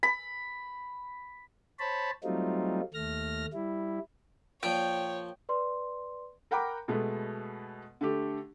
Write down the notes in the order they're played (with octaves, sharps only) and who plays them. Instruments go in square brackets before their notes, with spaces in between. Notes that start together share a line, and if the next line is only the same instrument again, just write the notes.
[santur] B5
[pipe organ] C5 C#5 A5 B5
F#3 G3 A3 C4 D#4 F4
D#2 A3 F6 A#6
G3 E4
[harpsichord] A#2 F3 [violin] C#5 [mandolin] G5
[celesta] B4 D5 C6
[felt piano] A#4 F#5 G5 A#5 B5 D6
B2 G#3 A3 B3
D3 A3 G4